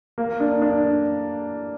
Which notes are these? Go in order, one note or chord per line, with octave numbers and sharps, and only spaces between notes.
A#3
D4
D4